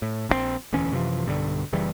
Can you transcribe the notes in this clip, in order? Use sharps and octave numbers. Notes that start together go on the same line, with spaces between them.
A2
A#1 F3 C4
E1 D2 E3 C#4
F#2 C3 E3 F3
B1 G2 D3 G3
F#1 C#3 E3 G3